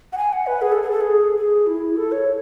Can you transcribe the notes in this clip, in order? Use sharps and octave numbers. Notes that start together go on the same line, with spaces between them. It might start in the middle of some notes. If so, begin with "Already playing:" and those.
F#5
G#5
F#5
B4
G#4
A4
G#4
A4
G#4
G#4
E4
A4
C#5